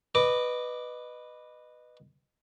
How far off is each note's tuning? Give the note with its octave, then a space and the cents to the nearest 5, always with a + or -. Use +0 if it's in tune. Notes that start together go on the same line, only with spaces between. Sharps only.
B4 +0 D#5 -20 D6 +0